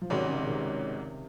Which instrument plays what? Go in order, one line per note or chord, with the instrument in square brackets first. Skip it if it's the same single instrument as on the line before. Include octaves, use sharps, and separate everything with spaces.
[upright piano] F3
[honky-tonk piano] G#1 G#2 F#3 C#4 F#4 [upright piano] C3 D#3
[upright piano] C#3
C#3
C3 D#3